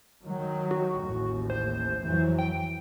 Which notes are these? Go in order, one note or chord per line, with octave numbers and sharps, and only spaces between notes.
D#3 F#3
F#4
A1 D#2 A2
C5
F2 E3 F#3
G5